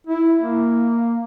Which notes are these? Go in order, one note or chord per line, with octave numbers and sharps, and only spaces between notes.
E4
A#3